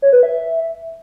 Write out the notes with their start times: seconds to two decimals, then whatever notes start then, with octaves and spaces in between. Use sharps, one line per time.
0.02 C#5
0.13 B4
0.23 E5